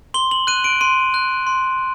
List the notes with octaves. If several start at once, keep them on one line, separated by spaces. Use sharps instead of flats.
C6 G7
F#7
F#6 D#7
D7
C6 D#7
F#6
C6